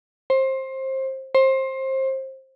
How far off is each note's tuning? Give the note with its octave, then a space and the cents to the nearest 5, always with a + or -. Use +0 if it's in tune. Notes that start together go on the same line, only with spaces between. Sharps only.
C5 +20
C5 +25